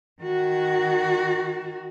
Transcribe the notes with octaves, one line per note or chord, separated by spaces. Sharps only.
D#3 F#4